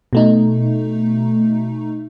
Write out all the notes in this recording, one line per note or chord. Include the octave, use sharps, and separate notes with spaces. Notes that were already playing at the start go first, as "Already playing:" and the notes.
B2 A3 D#4